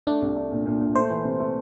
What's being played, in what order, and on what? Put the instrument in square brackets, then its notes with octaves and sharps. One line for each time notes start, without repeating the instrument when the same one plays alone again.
[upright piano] A3 [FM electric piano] D4
[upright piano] C2
A3
A#2
A#2
A#2
[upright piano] A3 [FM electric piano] C5
[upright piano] E3
C3
A3